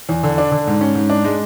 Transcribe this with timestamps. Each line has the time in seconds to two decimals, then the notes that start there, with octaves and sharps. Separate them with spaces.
0.09 E2
0.23 D3
0.38 D4
0.52 D3
0.67 G#2
0.81 C#4
0.95 G#2
1.10 D4
1.25 G#3